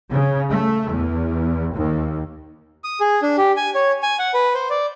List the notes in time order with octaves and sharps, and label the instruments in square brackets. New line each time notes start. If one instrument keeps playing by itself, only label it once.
[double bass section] C#3
A3
E2
D#2
[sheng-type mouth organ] D#6
G#4
D4
G4
G#5
C#5
G#5
F#5
B4
C5
D5